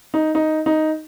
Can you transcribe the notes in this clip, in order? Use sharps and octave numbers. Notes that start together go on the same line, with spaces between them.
D#4
D#4
D#4